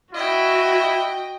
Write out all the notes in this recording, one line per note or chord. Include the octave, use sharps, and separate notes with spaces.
E4 F#4 D#5 G5